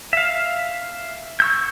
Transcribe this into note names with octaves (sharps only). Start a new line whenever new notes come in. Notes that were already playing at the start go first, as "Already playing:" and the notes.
E5 F5
C#6 E6 G6